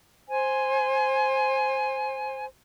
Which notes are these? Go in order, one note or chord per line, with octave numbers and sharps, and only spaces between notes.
C5 G#5